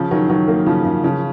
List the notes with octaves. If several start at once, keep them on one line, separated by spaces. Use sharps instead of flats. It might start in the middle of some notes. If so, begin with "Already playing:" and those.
Already playing: C#3 F3
D#3 F#3
D#3 F#3
F#3 A#3
C#3 F3
C#3
C#3 F3